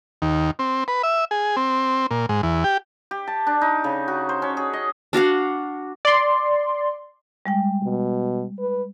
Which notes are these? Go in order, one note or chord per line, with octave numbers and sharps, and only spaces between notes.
D#2
C4
B4
E5
G#4
C4
A#2
G#2
E2
G4
G4
A5
D4
D#4
C#3
F#4
C5
C#4
G#4
D#5
D4 F#4 F5 F#5
D5 C6
G3 G#3 G5
B2
B4